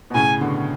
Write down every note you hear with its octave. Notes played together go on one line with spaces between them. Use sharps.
B2
A2 C#3 G#5
B2 D3